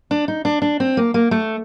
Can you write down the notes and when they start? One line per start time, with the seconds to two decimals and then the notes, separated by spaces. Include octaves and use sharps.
0.11 D4
0.28 D#4
0.45 D4
0.62 D4
0.80 C4
0.97 A#3
1.14 A#3
1.31 A3